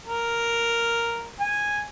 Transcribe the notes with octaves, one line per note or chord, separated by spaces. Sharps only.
A#4
G#5